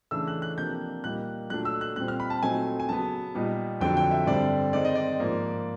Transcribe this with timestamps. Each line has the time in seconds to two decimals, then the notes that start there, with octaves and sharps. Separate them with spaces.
0.11 C#3 E3 A3 D4 E6
0.27 F#6
0.42 F#6
0.57 C3 F3 A#3 D4 G6
1.04 A#2 G3 A#3 D#4 F#6
1.50 A#2 F#3 A3 D4 F#6
1.65 E6
1.81 F#6
1.96 A#2 G3 C4 F#6
2.08 F6
2.20 B5
2.30 A5
2.42 A#2 F#3 A3 C4 D#4 G#5
2.80 G#5
2.88 C#3 F#3 B3 A5
3.35 A#2 G3 B3 D#4
3.80 F2 D3 F#3 G5
3.97 G5
4.11 E5
4.26 G2 D3 G3 C4 D5
4.73 D#3 G#3 C4 D#4 D5
4.85 D#5
4.95 D5
5.19 G#2 F3 A#3 D#4